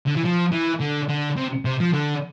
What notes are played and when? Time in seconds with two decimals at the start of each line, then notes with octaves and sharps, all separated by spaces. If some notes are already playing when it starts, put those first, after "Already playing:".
0.06 D3
0.16 E3
0.24 F3
0.52 E3
0.81 D3
1.09 D3
1.37 C3
1.65 C3
1.80 F3
1.94 D3